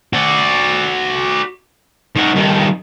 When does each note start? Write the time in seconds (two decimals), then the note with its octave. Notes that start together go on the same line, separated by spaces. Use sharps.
0.13 F#4 D5
2.16 D#3 F#4
2.35 G2 D#3